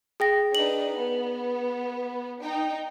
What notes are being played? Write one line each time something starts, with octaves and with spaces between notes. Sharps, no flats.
G#4 G5 A#6
D4 D#4 B4 F#7
B3
D#4 G5